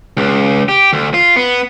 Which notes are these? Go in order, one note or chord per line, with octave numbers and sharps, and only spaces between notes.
C#2
G4
D2
F4
B3